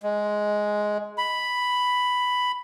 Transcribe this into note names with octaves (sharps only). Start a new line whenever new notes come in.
G#3
B5